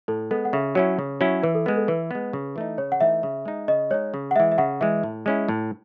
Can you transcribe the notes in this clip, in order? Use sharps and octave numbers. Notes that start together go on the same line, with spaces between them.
A2 A4
G#3 B3 A4
F#5
C#3 E5
F#3 C#4 E4 C#5
C#3
F#3 C#4 E4
E3 B4
A4
G#3 B3 B4
A4
E3 B4
G#3 B3
C#3
E3 A3 D#4
C#3 C#5
F#5
E3 A3 D#4 E5
C#3
G#3 D#4
C#3 D#5
G#3 D#4 C#5
C#3
F#5
E3 G#3 E5
E5
C#3 F#5
E3 G#3 E5
A2
G#3 C#4 E4
A2